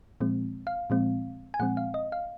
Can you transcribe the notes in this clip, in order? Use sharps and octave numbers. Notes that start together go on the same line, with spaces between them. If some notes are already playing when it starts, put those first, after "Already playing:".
A#2 F3 G#3 C4
F5
A#2 F3 G#3 C4
G#5
A#2 F3 G#3 C4 F#5
F5
D#5
F5